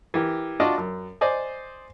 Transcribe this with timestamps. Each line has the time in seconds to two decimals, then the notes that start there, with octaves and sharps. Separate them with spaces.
0.14 E3 G4 A#4
0.60 D4 F4 F#4 D5 D#5
0.78 F#2
1.21 C5 D5 D#5 G#5